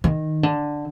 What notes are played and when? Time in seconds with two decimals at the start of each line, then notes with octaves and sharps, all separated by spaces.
0.04 D#3
0.43 D3